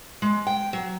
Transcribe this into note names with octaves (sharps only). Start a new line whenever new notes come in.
G#3
G5
F#3